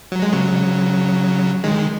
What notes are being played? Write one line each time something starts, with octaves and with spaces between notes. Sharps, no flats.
F#3
G#3
C#3 F#3
D#3 G#3